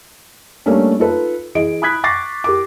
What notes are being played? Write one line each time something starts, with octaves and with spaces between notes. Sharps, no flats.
G3 A3 A#3 C#4 D4
D#4 F4 A4 B4
E3 G#4 D#5 D7
B5 D#6 F#6 G#6 B6
C#6 D6 A6 A#6 C7
G4 A#4 D6